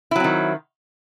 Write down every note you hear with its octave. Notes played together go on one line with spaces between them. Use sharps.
D#3 F#3 C4 E4